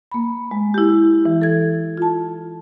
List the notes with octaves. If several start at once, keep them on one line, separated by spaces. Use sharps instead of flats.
A#3 B5
G#3
E4 G4
E3
A4 G#6
F4 A5